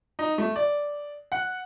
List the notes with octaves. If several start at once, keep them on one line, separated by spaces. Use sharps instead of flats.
D#4
A3
D5
F#5